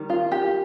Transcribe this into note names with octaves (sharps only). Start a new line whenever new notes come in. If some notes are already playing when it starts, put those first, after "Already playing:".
Already playing: D#3 G3
F4
G4